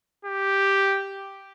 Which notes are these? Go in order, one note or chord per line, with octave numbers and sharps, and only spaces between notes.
G4